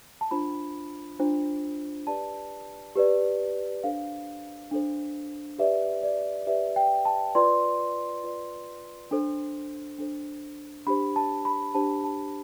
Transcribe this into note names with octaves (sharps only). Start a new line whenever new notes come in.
A5
D4 F4 C5 B5
D4 F4 C5
G4 B4 D5 A5
G4 B4 D5
D4 A4 C5 F5
D4 A4 C5
G4 B4 D5 E5
D5
G4 B4 D5 E5
G5
A5
F4 B4 D5 C6
F4 B4 D5
D4 A4 C5
D4 A4 C5
D4 G4 C5 B5
A5
B5
D4 G4 C5 A5
A5